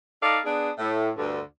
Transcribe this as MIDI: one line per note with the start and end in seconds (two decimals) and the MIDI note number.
0.22 0.38 63
0.22 0.38 69
0.22 0.38 74
0.22 0.38 77
0.44 0.69 59
0.44 0.69 62
0.44 0.69 68
0.78 1.09 45
1.16 1.40 38
1.16 1.40 43
1.16 1.40 50